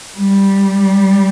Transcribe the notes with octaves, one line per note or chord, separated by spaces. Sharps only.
G3